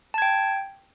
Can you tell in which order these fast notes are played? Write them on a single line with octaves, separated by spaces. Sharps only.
A5 G#6 G5